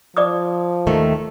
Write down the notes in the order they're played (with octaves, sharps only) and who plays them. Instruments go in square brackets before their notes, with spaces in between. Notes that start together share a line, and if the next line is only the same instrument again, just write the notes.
[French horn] F3 [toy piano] D5 D6 D#6
[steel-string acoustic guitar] D#2 D#3 A3